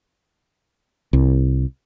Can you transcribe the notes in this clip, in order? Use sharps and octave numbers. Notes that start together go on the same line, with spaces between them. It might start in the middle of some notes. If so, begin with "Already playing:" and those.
C2